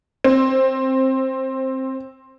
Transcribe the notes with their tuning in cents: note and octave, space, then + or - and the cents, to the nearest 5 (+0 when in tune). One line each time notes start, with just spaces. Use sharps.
C4 +15